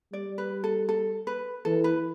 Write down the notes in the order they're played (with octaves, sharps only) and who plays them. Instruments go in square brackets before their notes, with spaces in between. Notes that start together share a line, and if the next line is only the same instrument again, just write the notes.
[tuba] G3 [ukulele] D5
[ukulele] B4
A4
A4
B4
[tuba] E3 [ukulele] A4
[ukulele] B4